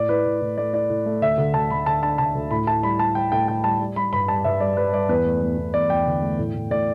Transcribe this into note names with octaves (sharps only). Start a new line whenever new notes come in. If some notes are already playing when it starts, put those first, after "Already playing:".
Already playing: A2 D5
E4 B4
A2
A2
A3 D5
E4 D5
A2
A3
D2 E5
D3
D2 A5
D2 B5
D3 A5
D4 A5
D3 A5
D2
A2 B5
E4 A5
G3 B5
G3 A5
G3 G5
A2 G5
A2 G5
G3 A5
G3
G3 B5
G2 B5
G3 A5
G2 E5
G3 D5
G3 B4
G3 D5
E2 B4
A3
E2
E2
E2 D5
E2 G5
D3
A3
A2
A2
A2 D5